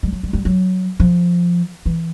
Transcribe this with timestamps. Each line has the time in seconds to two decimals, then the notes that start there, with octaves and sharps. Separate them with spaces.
0.03 G3
0.12 F#3
0.23 G3
0.33 G3
0.45 F#3
1.00 F3
1.86 E3